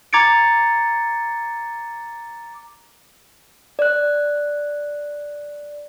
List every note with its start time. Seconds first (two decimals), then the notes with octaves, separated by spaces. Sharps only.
0.13 A#5 D6 G#6 A6 C#7 D7
3.79 D5 F#6